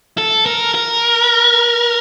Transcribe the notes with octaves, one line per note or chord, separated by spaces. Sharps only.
A4
A#4
A#4